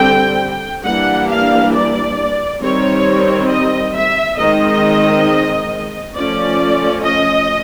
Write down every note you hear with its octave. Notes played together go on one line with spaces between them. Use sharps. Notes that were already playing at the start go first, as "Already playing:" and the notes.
Already playing: D3 G3 C4 G5
E3 G3 A#3 D4 F#5
F5
D5
D#3 G3 C4 C#5
D#5
E5
D#3 G#3 C4 D#5
F3 A3 C#4 D5
D#5